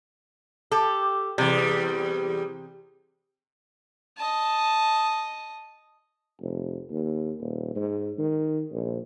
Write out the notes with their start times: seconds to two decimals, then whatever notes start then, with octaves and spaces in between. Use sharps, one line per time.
0.71 G4 A4
1.38 E2 C3 G3
4.17 D#5 A5
6.41 F1
6.90 D#2
7.40 D#1
7.76 G#2
8.19 D#3
8.72 A#1